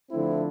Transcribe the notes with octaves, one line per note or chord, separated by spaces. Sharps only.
D3 F3 A3 C4 E4